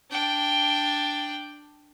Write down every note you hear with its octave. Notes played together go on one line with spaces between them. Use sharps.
D4 G5